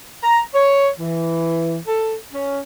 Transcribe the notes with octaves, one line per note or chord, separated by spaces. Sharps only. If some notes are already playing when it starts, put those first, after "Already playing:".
A#5
C#5
E3
A4
C#4